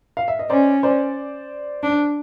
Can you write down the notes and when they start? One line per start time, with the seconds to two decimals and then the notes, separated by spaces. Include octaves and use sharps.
0.17 F5
0.28 E5
0.39 D#5
0.50 C#4 C5 D5
0.83 C5 D5
1.83 D4